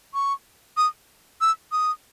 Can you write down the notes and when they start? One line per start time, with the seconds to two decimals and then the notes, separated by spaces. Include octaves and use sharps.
0.14 C#6
0.77 D#6
1.41 E6
1.72 D#6